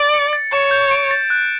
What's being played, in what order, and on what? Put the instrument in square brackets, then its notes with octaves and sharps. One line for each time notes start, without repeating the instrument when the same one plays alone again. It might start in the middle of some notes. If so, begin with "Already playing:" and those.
Already playing: [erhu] D5
[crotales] C#7
A6
[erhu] C#5 [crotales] E7
[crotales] G6
D7
A6
F#6